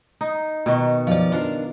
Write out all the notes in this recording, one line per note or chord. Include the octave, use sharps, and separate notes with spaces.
D#4
B2 D#3 F#4
F3 D5
D4 F4 A#4